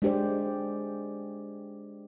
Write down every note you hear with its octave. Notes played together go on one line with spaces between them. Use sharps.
G#3 D4 G4 C5 D5